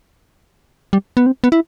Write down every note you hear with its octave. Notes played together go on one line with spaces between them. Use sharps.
G3
B3
C4
B3
E4